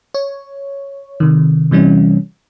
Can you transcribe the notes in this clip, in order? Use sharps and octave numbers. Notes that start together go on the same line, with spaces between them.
C#5
C3 D#3
C3 E3 G3 C#4